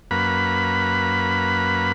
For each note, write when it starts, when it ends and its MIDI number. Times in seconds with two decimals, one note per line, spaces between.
0.11 1.92 42
0.11 1.92 58
0.11 1.92 71
0.11 1.92 83